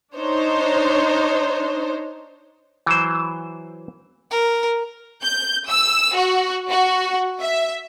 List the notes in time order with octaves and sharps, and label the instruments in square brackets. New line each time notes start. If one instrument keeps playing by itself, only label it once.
[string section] D4 D#4 C5 C#5
[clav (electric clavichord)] E3 F#3 C5
[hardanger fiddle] A#4
[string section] G6
E6
F#4
F#4
E5